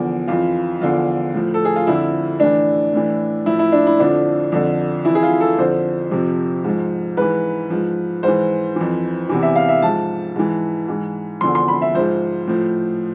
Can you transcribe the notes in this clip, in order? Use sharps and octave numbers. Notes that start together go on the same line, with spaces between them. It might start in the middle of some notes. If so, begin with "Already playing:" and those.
Already playing: E2 D3 F3
F2 E3 F4
E2 D3 F3 F4
A2 F3
A4
G#4
F4
F2 D3 F3 E4
A2 E3 D4
A2 E3
A2 F3 E4
E4
D4
E4
F2 D3 F3 D4
F2 D3 F3
F2 E3 E4
G#4
F4
A4
F2 D3 F3 C5
F2 C3 F3
G#2 F3
G#2 E3 B4
G#2 F3
G#2 E3 C5
F2 E3
E2 C3 E3
E5
F5
E5
G#2 F3 A5
G#2 E3
G#2 E3
E2 D3 F3 C6
C6
B5
E5
G#2 F3 C5
A2 F3